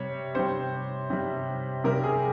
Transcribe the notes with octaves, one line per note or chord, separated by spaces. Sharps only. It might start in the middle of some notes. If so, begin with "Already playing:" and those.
Already playing: C3 G3 C#5
C3 G3 C5
C3 G3
C3 G3 A#4
G#4